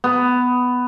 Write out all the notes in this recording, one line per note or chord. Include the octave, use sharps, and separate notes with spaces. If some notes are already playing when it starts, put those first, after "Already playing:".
B3